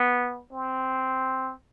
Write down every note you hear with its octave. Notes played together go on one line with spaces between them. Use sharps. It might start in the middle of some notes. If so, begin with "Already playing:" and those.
Already playing: B3
C4